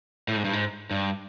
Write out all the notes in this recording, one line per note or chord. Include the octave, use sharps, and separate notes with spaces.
A2
G#2
G2
G#2
G2